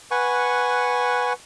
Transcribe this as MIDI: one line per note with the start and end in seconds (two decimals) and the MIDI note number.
0.11 1.33 71
0.11 1.33 78
0.11 1.33 80
0.11 1.33 85